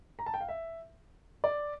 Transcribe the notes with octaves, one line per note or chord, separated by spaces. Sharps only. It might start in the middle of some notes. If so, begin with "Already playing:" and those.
A#5
A5
G5
F5
E5
D5